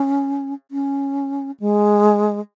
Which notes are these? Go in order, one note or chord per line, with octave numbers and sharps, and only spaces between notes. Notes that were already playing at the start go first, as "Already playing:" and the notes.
Already playing: C#4
C#4
G#3